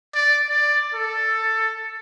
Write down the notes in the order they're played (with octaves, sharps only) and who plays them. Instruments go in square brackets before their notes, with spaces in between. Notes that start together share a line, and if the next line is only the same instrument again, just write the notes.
[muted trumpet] D5
D5
A4